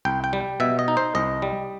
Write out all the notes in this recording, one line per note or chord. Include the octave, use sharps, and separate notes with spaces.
C2 G5
G5
G3
B2 E5
D#5
D#4
C5
C2 D#5
G3